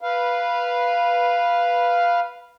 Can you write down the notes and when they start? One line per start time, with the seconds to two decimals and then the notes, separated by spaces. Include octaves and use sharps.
0.01 B4 F5